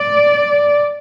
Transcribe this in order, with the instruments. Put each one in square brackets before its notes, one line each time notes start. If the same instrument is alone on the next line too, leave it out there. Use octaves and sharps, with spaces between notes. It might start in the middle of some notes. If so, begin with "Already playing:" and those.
Already playing: [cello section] D5